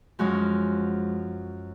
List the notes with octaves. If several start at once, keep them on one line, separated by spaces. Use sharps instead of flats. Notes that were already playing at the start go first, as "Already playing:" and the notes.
F#2 F3 G#3 F#4